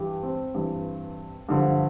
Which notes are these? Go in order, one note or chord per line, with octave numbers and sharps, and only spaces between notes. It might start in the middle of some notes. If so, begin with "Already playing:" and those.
Already playing: G2 E3 G4
C4
G2 E3
G2 D3 F3